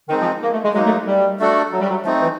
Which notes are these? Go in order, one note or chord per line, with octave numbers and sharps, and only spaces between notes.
D#3 G#3 C4 D#4
F3
A#3
A3
G#3
F#3 G#3 A#3 D#4
A3
G3
A3 D4 F#4 A4
F#3
G3
F#3
F3 A3 C4 D#4
E3